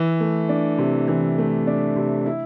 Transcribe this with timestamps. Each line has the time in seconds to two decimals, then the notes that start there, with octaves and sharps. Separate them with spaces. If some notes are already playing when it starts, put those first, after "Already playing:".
Already playing: E3
0.20 A3
0.49 D4
0.78 C3
1.08 E3
1.38 A3
1.67 D4
1.96 C3
2.26 E4